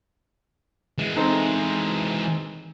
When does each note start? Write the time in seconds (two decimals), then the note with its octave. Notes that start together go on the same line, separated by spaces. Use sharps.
0.98 E3 G#3
1.16 C4 D#4 A4